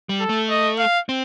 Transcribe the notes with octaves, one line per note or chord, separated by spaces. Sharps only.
G3
A4
A3
D#5
F5
C4